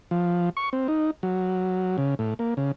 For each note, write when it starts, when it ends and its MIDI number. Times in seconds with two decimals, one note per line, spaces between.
0.11 0.49 53
0.57 0.70 85
0.73 0.88 60
0.88 1.11 63
1.23 1.97 54
1.98 2.15 49
2.19 2.34 45
2.39 2.54 58
2.57 2.72 49